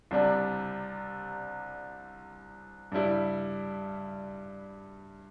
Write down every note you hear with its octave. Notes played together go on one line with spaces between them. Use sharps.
C2 C3 G3 D4
G2 G3 E4